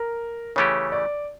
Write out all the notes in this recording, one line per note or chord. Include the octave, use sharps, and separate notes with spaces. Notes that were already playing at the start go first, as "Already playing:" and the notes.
Already playing: A#4
C#3 E3 A3 C#4 G4 C#5
D5